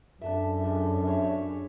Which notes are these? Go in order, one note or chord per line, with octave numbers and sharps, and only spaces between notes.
F#2 D4 A4 E5
G#3 D4 A4
D4 G#4 C#5 E5